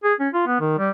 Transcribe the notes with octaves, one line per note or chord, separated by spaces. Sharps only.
G#4
C#4
F4
B3
D#3
G3